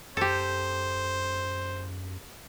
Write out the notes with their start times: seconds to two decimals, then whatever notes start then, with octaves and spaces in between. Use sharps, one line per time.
0.17 F#2 G4 A4 C5